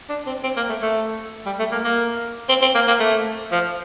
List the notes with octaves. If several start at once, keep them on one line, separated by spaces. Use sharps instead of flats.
D4
C4
C4
A#3
A3
A3
G3
A3
A#3
A#3
C4
C4
A#3
A#3
A3
F3